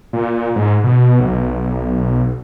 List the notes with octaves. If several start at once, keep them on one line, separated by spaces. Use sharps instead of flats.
A#2
G#2
B2
B1